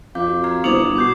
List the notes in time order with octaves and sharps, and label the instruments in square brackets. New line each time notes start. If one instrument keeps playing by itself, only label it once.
[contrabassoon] F2 [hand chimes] F5 D6 G6
[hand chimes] F#4
[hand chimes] A#5 F6 C7 [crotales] G#6
[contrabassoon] G1 [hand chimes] B3 D#6 [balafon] E4 C5 [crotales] D6 F7 F#7
[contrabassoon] B2 [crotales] D6 G6 C7